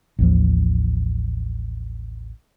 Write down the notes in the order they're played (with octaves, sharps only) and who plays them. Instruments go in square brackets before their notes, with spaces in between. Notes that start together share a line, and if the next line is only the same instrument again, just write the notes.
[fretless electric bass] A1 D#2 F3